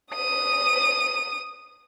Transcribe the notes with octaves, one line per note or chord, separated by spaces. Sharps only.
D#6 D#7